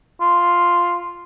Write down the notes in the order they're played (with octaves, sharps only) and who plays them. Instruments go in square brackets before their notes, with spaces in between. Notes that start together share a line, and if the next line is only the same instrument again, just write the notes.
[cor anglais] F4